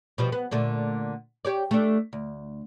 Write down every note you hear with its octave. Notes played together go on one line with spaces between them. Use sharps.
B2 F3 G3
B3
A#2 D3 A3
G4 C#5 D5
A3 D4
D2